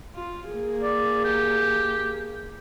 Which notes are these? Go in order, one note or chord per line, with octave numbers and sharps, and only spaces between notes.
F4
A#3 G#4
D5
G4